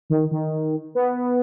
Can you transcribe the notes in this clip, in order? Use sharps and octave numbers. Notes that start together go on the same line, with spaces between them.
D#3
D#3
B3